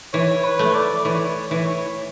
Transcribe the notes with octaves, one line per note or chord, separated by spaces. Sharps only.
E3 C#5
B4
A3
D5
E3 C#5
E3